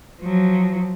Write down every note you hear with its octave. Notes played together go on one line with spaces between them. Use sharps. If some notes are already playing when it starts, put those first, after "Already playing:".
F3 F#3